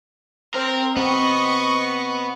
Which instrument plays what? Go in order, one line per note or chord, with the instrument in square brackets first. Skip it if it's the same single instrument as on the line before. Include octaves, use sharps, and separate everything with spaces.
[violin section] C4 [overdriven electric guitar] A#4
[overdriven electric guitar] B3 [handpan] C4 [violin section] D#5 C#6